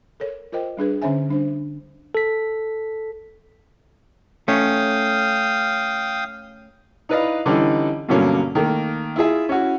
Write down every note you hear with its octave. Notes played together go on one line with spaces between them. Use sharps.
A4 A#4 C#5
F4 A#4 C5 D#5 G5
G3 D4 G#4 B4
D3 C#4 C5 C#5 E5 G#5
G3 D4 C5
A4 B6
A3 C#4 F5 G5 D#6
D#4 E4 B4 D5 D#5 F5
D3 E3 G3 C#4 D#4
G2 B2 D3 F#3 A#3 C#4
D#3 A3 A#3
E4 F4 G#4 E5
C#4 E4 F#4